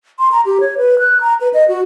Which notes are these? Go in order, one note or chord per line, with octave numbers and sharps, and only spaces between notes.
C6
A#5
G4
C#5
B4
F#6
A#5
B4
D#5
F#4